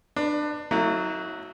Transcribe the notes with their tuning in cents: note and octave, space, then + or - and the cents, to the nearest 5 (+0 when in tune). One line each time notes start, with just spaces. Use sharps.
D4 +25 B4 +10
F#3 +0 A3 +40 E4 -45